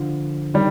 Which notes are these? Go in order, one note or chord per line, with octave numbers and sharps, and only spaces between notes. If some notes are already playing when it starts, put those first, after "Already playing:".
Already playing: D3 F3
D#3 G3